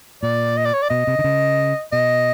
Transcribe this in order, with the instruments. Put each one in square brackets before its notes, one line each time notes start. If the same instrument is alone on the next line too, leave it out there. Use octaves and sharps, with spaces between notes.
[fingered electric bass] A#2 [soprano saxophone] D5
[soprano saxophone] D#5
D5
C#5
D5
[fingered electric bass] B2 [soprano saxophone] D#5
[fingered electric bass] C3
D3
C#3
[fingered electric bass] B2 [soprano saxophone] D#5